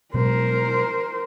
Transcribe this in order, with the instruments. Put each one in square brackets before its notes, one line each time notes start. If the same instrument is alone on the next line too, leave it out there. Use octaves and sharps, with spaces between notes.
[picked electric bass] B2 F#3 G#3 [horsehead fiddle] A#4 C5